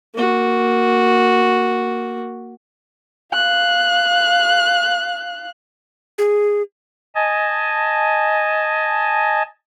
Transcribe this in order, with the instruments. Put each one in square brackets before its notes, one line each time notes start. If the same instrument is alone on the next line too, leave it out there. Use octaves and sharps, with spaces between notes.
[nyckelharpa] A#3 F#4
[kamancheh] F5 F#6
[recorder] G#4
[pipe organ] D#5 G#5 A5